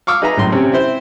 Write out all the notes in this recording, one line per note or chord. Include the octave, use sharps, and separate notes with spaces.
F5 C#6 D6 E6 F6
D#4 G#4 B4 D#5 E5 A#5
A1 F#2 A2 C6
C3 C4 C#4
C4 E4 C5